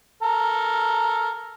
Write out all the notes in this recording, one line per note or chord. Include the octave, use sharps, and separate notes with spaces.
A4 A#4